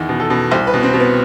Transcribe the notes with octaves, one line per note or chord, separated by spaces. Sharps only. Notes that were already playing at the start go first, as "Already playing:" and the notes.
Already playing: E2 D#3
B2
A4
B2
C2 C5
B4
B2
C4
B2
B3